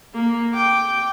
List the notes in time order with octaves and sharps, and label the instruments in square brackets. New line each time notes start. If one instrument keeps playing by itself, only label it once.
[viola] A#3
G5 D6